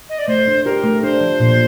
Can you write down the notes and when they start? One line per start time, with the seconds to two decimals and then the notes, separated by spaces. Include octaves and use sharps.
0.09 D#5
0.19 D5
0.28 A3 C5
0.47 D4
0.65 G4 A#4
0.84 A3
1.03 D4 C5
1.21 F3
1.40 A#2